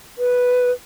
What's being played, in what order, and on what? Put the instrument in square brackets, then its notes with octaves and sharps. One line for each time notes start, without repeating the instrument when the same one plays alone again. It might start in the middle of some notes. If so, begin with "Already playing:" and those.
[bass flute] B4